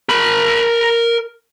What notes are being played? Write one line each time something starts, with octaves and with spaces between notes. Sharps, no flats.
A#4 B5